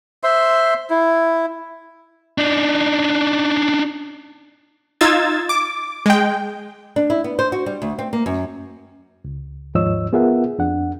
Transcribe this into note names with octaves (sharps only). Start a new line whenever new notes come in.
C5 E5 C6
E4
D4 D#4
D#4 F4 E6 G#6 A6
D6
G#3 G5
D4
E4
B3
C5
F#4
G3
D2
C4
A#3
F#2
C#2
D#2 G#2 F3 C#5 D#5 E6
B3 F4 G#4 A#4 E5 F#5
F2 D4 F#5